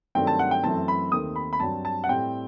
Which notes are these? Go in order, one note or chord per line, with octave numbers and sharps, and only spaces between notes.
G2 D#3 F#3 A3 C4 G5
A5
F#5
G5
F#2 E3 A3 C4 A5
B5
D#2 D#3 A3 C4 D#6
B5
B5
G2 F#3 C4 A5
A5
F#5
A2 G3 C4 G5